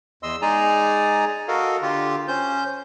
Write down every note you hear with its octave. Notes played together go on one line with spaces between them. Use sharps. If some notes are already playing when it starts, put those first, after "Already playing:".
E2 D#5 C6 E6
G#3 D#4 G#4 D5 G#5 A#5
F#4 A4 A#4 D#5 F5
D3 F4 G4
C#4 C5 G6